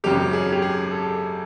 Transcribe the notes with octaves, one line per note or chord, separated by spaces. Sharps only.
G#1 F#2 C#3 G4
G#4
G4
G#4
A4